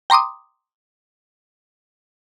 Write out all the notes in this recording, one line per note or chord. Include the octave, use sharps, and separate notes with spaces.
G5 A#5 C6 D6 D#6